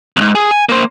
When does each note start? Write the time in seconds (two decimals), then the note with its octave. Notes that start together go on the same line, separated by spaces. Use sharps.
0.17 B1 G#2
0.35 G#4
0.51 G#5
0.69 A#3 C5